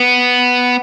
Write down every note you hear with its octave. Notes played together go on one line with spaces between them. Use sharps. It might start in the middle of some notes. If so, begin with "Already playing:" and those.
Already playing: B3